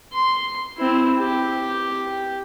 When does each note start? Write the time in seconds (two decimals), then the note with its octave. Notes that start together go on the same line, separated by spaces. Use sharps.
0.13 C6
0.78 C4 E4
1.19 G4